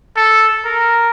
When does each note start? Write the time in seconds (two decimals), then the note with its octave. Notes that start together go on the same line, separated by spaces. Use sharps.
0.16 A4
0.65 A#4